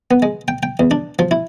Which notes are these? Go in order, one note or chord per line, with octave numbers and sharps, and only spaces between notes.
B3
G#3
G5
G5
E2
D4
F3
E4